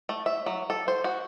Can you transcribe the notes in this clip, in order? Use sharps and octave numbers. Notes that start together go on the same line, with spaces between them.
A3
E5
F#3
A4
C5
F#4